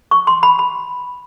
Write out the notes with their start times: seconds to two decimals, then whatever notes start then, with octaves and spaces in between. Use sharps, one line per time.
0.11 C#6
0.27 C6
0.43 B5
0.59 B5